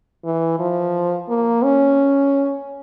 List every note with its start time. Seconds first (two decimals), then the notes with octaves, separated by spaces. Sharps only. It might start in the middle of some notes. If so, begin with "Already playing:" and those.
0.24 E3
0.59 F3
1.29 A#3
1.64 C#4